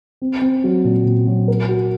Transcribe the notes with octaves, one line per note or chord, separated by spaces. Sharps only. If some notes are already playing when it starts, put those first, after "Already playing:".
C4
C4
F#3
A#2
A#2
F#3
A#4
F#4